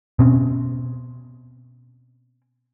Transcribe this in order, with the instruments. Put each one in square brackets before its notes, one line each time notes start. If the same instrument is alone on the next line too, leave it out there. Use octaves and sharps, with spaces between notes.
[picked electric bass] B2 C4 C#4